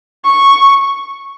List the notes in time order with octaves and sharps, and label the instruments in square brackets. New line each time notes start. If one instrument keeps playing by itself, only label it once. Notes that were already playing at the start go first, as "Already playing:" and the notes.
[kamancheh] C#6